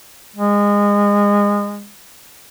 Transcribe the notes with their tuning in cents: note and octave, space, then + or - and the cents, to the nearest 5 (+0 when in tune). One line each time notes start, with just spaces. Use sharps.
G#3 -25